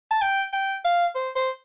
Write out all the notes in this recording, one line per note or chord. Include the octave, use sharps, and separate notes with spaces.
A5
G5
G5
F5
C5
C5